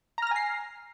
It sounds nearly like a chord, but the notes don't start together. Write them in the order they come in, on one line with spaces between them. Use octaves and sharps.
A#5 F6 A#6 G#5 C7